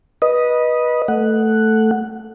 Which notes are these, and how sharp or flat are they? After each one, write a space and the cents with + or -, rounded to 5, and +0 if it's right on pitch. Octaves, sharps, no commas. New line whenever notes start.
B4 -20 D#5 +0
A3 +0 F#5 +0